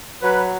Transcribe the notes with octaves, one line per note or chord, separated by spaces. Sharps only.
F#3 B4